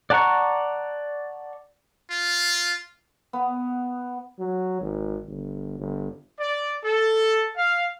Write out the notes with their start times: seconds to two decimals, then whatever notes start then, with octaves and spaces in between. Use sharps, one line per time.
0.10 D5 F#5 A5 A#5 C#6
2.11 F4
3.33 B3
4.39 F#3
4.81 G#1
5.27 G1
5.79 G1
6.39 D5
6.82 A4
7.56 F5